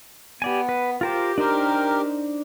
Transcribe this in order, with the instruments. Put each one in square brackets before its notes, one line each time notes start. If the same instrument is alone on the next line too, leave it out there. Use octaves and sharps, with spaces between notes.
[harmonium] B3 [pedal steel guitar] G4 D5 G#5
[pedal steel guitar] B4
[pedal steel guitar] F4 A#4 C5 [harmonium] G4
[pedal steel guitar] D4 D#4 C5 [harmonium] G4 A#4